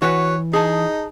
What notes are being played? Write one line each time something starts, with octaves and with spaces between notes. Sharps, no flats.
E3 F#4 B4 C#5
D#4 G#4 A5